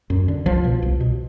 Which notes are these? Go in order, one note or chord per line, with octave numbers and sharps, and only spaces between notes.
F#2
D3
C2 F3
B2
C2
B2